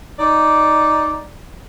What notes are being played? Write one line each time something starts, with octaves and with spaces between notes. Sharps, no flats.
D#4 D5